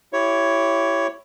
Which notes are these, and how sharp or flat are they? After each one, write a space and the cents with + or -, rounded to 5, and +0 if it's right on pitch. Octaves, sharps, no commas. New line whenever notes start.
E4 +15 G4 -15 C#5 +5